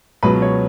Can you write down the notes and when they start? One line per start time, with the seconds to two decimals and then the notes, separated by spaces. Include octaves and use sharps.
0.23 C#2 B2 F#3 B4
0.42 C#5